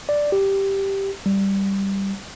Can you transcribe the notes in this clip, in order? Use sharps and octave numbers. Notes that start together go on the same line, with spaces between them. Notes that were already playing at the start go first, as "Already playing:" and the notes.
D5
G4
G3